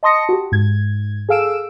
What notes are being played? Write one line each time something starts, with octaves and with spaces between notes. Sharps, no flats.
D#5 A5 C6 D#6 A#6 C#7
F#4 G4
G#2 G#6
G#4 A4 F5 E6 D7 E7